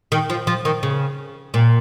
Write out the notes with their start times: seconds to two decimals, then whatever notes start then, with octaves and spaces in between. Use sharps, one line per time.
0.12 D#3
0.30 F3
0.47 F3
0.65 D#3
0.83 C#3
1.54 A#2